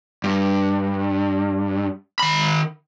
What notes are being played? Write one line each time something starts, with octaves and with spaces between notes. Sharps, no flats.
G2
D#3 B5